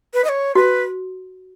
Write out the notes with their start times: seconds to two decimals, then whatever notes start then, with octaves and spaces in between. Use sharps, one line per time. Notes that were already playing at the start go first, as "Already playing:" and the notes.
0.14 B4
0.24 D#5
0.29 C#5
0.55 F#4 B4